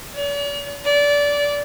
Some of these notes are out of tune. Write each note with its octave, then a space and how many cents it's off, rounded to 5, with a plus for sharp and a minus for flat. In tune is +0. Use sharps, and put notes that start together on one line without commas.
D5 -45
D5 -20